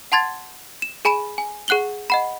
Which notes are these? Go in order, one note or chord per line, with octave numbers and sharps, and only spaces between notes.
F#5 A5 C6 G#6 A6
E7
G#4 G#5 B5 D7 E7
G#5
G#4 F#5 F#6 F#7 G7
D#5 F#5 B5